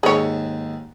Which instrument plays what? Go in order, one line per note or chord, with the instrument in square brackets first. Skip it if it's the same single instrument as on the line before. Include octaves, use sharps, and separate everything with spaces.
[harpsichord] D#2 G#2 [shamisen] G#4 C#5